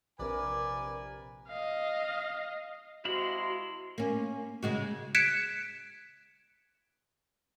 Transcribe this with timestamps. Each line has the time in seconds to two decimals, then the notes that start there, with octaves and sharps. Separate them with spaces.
0.19 A#1 C3 A#4 B4 D5 G#5
1.48 D#5 F5
3.05 C3 G#3 E4 F#4 F5 B5 C6
3.98 A#3 C#4
4.63 C#3 G#3 F#4
5.15 F#6 G#6 B6 C#7 D7 E7